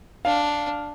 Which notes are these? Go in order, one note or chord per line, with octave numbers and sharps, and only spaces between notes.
D4 F5